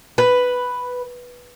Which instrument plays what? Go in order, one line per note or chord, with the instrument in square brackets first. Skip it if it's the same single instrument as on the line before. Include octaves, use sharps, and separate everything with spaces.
[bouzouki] B4